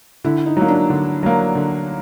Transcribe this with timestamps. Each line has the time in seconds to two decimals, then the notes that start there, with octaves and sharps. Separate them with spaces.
0.24 D3 E4
0.46 D#4
0.57 F#3 A#3
0.68 D4
0.90 D3
1.23 F#3 A#3
1.55 D3